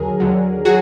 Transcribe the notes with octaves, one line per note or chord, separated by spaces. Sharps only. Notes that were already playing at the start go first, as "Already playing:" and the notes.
Already playing: D#2 D3 F#3 G#4 A#4
D#2 D3 F#3
F#3 F#4 G#4